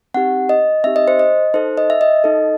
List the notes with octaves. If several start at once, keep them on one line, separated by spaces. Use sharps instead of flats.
C4 D#4 G4 F#5
D#5
C4 D#4 G4 E5
D#5
C5
D#5
D#4 A4 C5
D#5
E5
D#5
D#4 A4